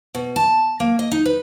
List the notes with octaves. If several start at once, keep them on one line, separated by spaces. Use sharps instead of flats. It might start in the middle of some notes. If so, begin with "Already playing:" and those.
B2
A5
A#3
D#5
D#4
B4